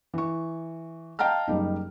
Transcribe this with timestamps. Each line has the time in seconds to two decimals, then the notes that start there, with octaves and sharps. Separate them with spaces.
0.14 E3 C#6
1.19 D#5 F5 G5 A5 A#5 F6
1.48 F#1 G3 D#4